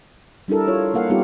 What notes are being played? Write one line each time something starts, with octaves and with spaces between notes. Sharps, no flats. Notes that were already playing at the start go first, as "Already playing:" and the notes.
G3 D4 E4 A4 A#4
F4 C#5
A#3 A#4 F5 F#5
G3 B3 D#4 F4 G4